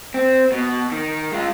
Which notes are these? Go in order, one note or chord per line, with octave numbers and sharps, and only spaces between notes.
C4
B2
D#3
G#3 F4